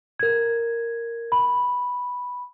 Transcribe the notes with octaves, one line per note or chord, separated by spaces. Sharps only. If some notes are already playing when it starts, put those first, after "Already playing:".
A#4 G#6
B5